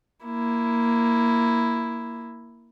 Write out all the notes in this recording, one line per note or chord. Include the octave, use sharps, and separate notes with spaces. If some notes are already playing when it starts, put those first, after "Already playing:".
A#3 E4